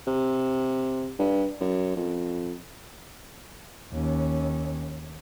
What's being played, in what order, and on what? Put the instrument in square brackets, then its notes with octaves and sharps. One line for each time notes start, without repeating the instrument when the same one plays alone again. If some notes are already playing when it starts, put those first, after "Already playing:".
[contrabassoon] C3
G2
F#2
F2
[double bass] D#2 C#4